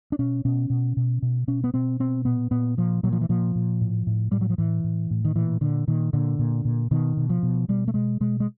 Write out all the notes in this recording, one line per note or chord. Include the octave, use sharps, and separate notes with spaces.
D4
B2 C#4
B2 C#4
B2
B2
B2
B2 C#4
B3
B2 C4
B2 C4
A#2 B3
A#2 B3
A#2 F3
A#2 F#3
F3
E3
A#2 F3
A#2
A2
A2
A2 G3
F#3
F3
A2 E3
A2
A2
D#3
A#2 E3
A#2 D3
A#2 D#3
A#2 D3
A#2
A#2
B2 D#3
B2
F3
B2
B2 G3
A3
B2 G#3
B2 G#3
G#3